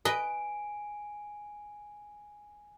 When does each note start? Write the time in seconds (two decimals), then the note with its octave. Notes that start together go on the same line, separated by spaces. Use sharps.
0.05 B4 D#5 G#5 D7